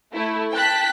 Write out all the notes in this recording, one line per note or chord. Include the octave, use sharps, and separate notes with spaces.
A3 E4
G5 A5 F#6 B6